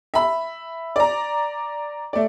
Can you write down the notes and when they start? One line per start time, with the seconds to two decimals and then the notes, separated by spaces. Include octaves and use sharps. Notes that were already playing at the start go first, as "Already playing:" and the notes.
0.14 E5 B5
0.96 D5 A#5
2.13 A3 D5